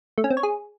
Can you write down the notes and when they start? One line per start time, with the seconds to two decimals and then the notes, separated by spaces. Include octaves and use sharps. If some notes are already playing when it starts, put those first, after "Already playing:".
0.18 A3
0.24 C#4
0.30 C4
0.37 C#5
0.43 G#4